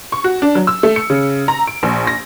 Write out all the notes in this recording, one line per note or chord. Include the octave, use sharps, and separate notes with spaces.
C#6
F#4
D4
F#3
E6
A3
C#7
C#3
A#5
D7
A#1
A#6